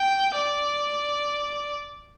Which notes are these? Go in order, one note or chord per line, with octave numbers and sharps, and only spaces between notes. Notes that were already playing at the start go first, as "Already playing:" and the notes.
Already playing: G5
D5